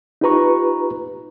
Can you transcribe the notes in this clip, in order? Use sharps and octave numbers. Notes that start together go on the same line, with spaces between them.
D#4 F4 G4 B4 A#5 C#6